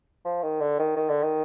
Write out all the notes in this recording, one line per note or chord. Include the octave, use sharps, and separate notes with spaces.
F3
D#3
D3
D#3
D#3
D3
D#3